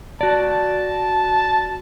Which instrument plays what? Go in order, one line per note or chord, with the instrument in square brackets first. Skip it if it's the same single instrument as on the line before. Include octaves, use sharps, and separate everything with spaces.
[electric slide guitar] F#4 D5 [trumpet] A5